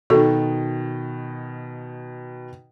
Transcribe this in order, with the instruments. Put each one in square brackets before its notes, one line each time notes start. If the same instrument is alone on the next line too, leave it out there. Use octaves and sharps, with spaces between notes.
[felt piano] B2 D#3 [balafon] F#4 A4